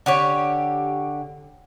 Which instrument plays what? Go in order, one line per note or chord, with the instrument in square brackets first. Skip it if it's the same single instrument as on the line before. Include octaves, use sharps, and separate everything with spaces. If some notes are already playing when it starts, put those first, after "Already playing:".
[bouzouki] D3 G4 C#5